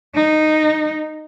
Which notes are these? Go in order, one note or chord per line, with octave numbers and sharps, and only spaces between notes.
D#4